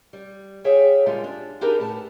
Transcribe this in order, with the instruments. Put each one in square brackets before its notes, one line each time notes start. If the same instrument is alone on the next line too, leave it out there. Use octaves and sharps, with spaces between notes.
[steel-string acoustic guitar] G3
G#4 C#5 E5 F5 G5 G#5
A#2 D3 G3 G#3 F4
D4
D4 D#4 G4 G#4 A#4 B4
A2 A5